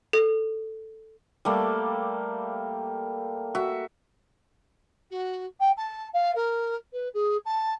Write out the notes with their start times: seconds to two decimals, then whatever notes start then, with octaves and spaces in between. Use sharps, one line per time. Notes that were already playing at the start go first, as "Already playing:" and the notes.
0.13 A4
1.45 G3 A3 A#3
3.55 F#4 E5
5.10 F#4
5.60 G5
5.77 A5
6.13 F5
6.35 A#4
6.93 B4
7.13 G#4
7.45 A5